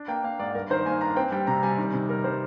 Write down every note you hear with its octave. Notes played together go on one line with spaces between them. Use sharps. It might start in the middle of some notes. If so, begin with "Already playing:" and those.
Already playing: D4
A#3 G5
A#3 F5
G#2 D5
G2 A#4
D#3 C5
A#3 G#5
D4 A#5
C4 G5
G3 G5
C3 A#5
G3 G#5
D#3
C3
G3 A#4
G3 C5